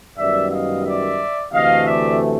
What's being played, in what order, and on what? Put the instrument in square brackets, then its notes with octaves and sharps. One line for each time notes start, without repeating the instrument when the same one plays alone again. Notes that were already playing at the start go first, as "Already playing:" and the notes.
[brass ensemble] F#2 D#3 G3 B3 D5 E5
D#5 F5
D5 E5
D2 C3 E3 A3 D#5 F5
D5 E5